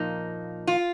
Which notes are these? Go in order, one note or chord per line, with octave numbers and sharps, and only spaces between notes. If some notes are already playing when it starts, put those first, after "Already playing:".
Already playing: A#2 F3 A#3 D#4
F4